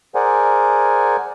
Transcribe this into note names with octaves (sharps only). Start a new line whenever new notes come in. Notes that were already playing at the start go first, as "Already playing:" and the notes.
G#4 A#4 C5 D5 F#5 G#5